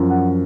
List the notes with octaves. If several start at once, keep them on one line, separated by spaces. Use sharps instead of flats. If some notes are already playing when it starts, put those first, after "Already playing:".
Already playing: F#2 F3
F#5